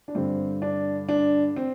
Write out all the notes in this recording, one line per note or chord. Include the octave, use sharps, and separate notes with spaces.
D4
G2 D3 C4
D4
D4
C4